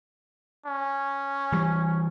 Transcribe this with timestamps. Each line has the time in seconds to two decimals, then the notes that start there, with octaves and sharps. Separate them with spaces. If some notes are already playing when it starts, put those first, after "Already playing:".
0.66 C#4
1.52 E3 G3